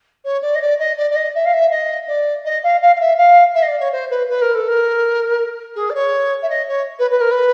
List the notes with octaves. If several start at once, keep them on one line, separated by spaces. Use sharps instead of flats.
C#5
D5
D#5
D5
D#5
D5
D5
D#5
E5
F5
E5
D#5
D5
D#5
F5
F5
F5
E5
F5
E5
D#5
D5
C#5
C5
B4
B4
A#4
A4
A#4
G#4
D5
C#5
E5
D#5
C#5
B4
B4
A#4
B4